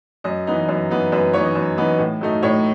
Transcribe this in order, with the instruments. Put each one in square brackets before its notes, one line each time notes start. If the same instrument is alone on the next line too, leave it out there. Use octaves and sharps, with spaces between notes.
[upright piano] F#2 D#5
E3 B3 D#4
F#2
E3 B3 D#4
F#2 B4
E3 B3 D#4 C#5
D#5
F#2
E3 B3 D#4
A2
F#3 A3 D#4
A2 C#5